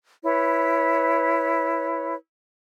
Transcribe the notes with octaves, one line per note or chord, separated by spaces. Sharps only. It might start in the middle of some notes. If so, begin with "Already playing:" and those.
E4 B4 C#5